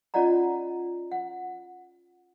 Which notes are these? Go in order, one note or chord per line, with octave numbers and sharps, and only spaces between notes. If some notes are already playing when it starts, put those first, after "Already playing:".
C#4 F4 D5 D#5 F#5 A#5
F#5